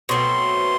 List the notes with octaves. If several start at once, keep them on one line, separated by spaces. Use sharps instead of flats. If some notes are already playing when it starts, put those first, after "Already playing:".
B2 F#3 A3 C4 C6